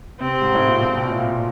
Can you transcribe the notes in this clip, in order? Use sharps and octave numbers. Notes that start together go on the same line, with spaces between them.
C3 C4
G#2
A2
A#2
B2
B2
A#2
A2
A#2